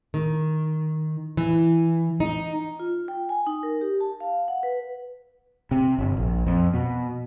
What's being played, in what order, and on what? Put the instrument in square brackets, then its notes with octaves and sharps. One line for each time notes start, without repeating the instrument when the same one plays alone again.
[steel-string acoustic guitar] D#3
E3
D#4
[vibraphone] F4
G5
G#5
D#4
A#4
G4
A5
F5
F#5
B4
[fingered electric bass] C3
G1
A#1
F2
B2